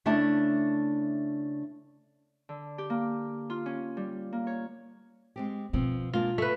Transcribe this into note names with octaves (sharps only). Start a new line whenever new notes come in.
C#3 A3 D4 E4 A5
D3
G4
A#3
F4
C#4
G3
A#3
C#5
G#3 C4 G4
B2 F3 B3 C4
G#3 A#3 D4 F4
A3 B4 E5